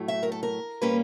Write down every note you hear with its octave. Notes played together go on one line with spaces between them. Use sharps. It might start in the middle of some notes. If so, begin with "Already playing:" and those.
Already playing: A2 F#3 A3
E5
A#4
A4
A#4
A#2 G3 A#3 C#4 B4